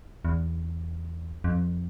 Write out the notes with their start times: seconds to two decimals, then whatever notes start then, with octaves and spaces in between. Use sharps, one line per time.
0.25 E2
1.44 F2